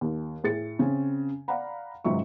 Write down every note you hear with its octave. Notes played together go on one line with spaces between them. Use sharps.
D#2
A2 G#4 A6 C#7
C#3 C4 C#4
D5 F5 F#5 A#5 B5
G#1 C#2 G#2 F#3 E5 C#6